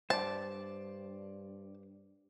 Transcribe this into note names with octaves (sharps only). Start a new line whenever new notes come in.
G2 C5 D5 A5